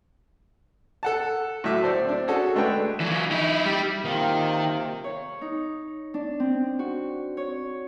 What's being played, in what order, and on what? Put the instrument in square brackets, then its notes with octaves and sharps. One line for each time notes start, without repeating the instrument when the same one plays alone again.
[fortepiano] A4 F#5 A5
A2 F#3 E5 D6
A3 A4 C5 D5
C4 D4
C#4 F#4 G#4 A4
G#3 A3 D4 B4 G5
[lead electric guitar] E3 F#3
D#4 E4
G3
[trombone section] C3 A#3 [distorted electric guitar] D#3 [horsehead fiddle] F4 G5
[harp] C#5
D#4
D4
C4
F#4
C#5